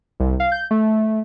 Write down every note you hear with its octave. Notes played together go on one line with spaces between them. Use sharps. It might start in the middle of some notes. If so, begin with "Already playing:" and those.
C2
F5
G6
A3